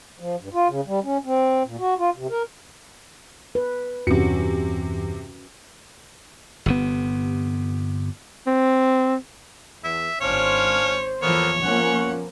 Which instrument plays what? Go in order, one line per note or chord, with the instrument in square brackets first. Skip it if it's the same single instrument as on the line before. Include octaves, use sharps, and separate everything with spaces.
[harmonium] F3
G2
F4
C#3
G3
C#4
C4
A#2
F#4
F4
C3
A#4
[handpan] B4
[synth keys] E2 G2 E3 [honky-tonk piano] C3 C#7 [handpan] C#4 F#4
[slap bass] G1 C3 B3
[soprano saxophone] C4
[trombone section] E2 [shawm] E5
[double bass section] G#1 [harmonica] C#4 D4 F5 [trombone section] C5 [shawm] C#5
[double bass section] E2 E3 F3 [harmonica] A#3 B3 A4 [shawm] C#5
[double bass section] F3 A#3 B3 [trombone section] C#4 [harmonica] F#5